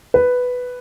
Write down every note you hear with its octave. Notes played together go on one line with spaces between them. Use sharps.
B4